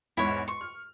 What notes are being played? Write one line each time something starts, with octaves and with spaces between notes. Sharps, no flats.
E2 G#2 E4 C#5
C6 C#6
F6